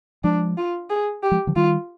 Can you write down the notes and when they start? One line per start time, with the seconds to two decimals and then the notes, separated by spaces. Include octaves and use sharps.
0.24 F3 G#3 D4
0.58 F4
0.90 G#4
1.23 G4
1.31 F3 G#3
1.47 D3 F3
1.56 D#3 G3 F4